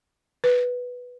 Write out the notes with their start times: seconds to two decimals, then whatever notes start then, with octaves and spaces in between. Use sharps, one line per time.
0.44 B4